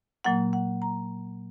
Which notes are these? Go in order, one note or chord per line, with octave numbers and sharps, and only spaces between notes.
A#2 F#3 A#3 F#5
F#5
A#5